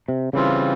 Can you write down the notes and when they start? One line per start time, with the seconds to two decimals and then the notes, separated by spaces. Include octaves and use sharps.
0.08 C3
0.33 C#3 E3 G3 C4 F4